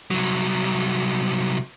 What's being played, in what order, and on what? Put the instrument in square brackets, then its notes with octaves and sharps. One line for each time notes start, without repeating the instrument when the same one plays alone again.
[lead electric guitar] C2 F#3